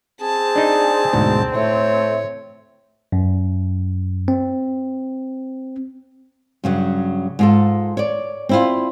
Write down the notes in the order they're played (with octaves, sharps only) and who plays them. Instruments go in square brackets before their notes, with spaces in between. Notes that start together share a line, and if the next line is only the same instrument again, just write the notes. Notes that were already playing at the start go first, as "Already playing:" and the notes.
[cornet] C4 [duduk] G#4 [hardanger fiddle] A5
[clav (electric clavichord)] D4 D#4
D2 G#2 B2
[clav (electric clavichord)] A2 [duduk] A3 [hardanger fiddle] C#5
[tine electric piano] F#2
C4
[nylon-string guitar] G2 C#3 F#3
G#2 F4 A4
C#5 D5
C4 E4 F4